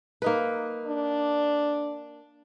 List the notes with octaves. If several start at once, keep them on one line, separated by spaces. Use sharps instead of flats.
A#3 D#4 B4
D4